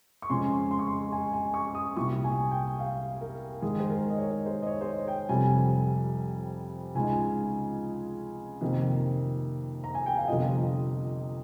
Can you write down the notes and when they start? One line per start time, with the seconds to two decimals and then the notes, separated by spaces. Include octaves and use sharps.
0.22 C#6
0.30 F2 C#3 G#3 C#4 C6
0.71 C6
0.79 C#6
0.87 C6
1.12 G#5
1.33 G#5
1.54 C#6
1.75 D#6
1.96 C2 A#2 G3 C#6
2.24 G#5
2.51 G5
2.79 F5
3.21 A#4
3.62 G#2 D#3 G#3 G#4
3.80 C5
3.90 A#4
4.10 D#5
4.18 C#5
4.46 C5
4.62 D#5
4.67 C#5
4.81 C5
4.87 C#5
5.08 G5
5.29 F1 F2 C3 G3 G#5
6.95 C#2 C#3 G#3 D#4 G#5
8.61 F2 C3 D#3 A#3
9.84 A#5
9.95 G#5
10.06 G5
10.17 F5
10.28 G1 F2 C3 F3 D#5